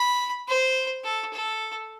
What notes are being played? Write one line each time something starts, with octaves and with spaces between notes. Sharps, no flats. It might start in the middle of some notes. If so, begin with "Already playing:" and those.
Already playing: B5
C5
A4
A4